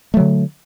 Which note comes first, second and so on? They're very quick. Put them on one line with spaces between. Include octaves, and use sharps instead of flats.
A3 F#3 D3